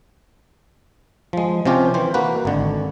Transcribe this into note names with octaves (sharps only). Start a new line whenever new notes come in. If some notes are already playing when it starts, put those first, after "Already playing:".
F3 G#3
C3 F3 C#4 F4 G4
E3 C5
A#3 F#4 B4
G#1 D3